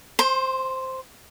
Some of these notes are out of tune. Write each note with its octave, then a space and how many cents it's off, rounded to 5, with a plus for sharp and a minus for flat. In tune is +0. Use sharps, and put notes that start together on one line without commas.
C5 +0 C6 +30